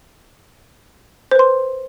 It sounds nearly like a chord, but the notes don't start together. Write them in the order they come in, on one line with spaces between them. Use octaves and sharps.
C5 B4 C6